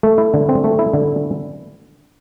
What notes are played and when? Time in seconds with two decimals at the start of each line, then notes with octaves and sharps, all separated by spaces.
0.03 A3
0.18 E4
0.34 D3
0.49 C4
0.64 A3
0.79 E4
0.93 D3